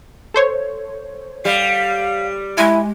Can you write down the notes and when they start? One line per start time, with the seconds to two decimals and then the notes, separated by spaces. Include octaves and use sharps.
0.34 A4 C5 C#5
1.45 G3 F5
2.58 G#3 E4 G#5